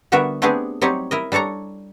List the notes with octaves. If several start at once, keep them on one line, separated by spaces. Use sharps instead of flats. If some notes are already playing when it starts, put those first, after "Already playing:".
D3 G3 B3 F#4 A#4 E5
A3 B3 C4 D4 G4 G#4
F#3 G3 C4 D#4 G4 C#5
E4 A#4 D#5
G3 D4 A4 C#5 A#5